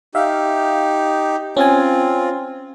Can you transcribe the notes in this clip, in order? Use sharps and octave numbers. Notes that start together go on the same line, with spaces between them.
D#4 G4 E5 F5
C4 C#4 F4 G#5